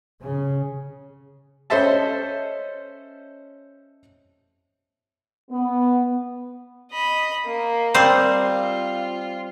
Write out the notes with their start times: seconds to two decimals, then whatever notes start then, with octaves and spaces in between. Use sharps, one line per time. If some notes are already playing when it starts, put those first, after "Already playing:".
0.21 C#3
1.70 C#4 A4 C5 D#5 E5 A5
5.50 B3
6.92 D#5 B5
7.45 A#3
7.94 G3 C4 C5
8.39 F4